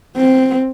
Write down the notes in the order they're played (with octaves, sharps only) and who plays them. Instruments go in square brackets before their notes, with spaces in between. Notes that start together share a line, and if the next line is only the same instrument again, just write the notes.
[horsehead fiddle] C4